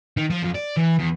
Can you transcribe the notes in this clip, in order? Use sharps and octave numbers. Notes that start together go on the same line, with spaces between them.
D#3
F3
F2
D5
E3
E2